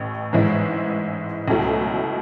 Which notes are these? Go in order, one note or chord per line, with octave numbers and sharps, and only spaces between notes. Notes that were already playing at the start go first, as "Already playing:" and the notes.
Already playing: A1 A2
G#2 E3 G#3 C#4 E4
C#2 B2 F#3 A3 E4